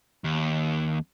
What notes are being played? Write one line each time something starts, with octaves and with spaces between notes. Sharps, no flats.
D#2